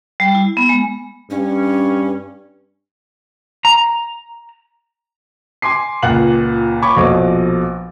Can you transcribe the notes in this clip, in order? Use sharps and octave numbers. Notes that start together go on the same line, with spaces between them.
G3
E4
B3
G#3
G2 C#4
A#5
G#5 C6 D6 C7
C#2 A#2 F#5 F#6 F#7
C#5 B5 C#6 D6
A#1 B2 F3 A4 D#5 D6